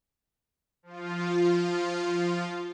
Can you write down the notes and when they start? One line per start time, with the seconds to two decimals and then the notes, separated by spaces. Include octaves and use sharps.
0.83 F3 F4